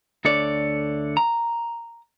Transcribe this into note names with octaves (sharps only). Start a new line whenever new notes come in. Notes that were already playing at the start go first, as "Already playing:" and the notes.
D2 D3 A4 C#5 D5
A#5